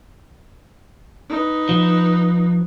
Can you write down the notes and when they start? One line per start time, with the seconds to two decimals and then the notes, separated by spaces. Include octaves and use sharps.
1.30 D#4 B4
1.69 F3